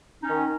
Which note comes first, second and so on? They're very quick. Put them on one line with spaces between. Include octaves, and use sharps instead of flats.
D#4 C#4 D#3